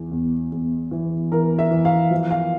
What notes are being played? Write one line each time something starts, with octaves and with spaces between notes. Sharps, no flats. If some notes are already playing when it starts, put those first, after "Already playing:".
Already playing: E2 E3
E2
E2
E3
E3 A#4
E5
E3
F5
F3
F5